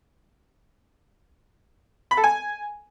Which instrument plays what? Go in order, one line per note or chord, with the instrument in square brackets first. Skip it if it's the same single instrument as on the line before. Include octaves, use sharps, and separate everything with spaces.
[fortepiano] B5
A4
G#5